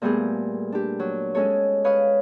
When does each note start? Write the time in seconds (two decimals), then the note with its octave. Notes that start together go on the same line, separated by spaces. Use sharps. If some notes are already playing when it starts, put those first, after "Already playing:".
0.02 A#2 G3 A3 B3 G4 G#4
0.72 D4 G4
0.99 F#3
1.35 G#3 C#4 G#4 A4 C#5
1.84 B4 C#5 F5 D#6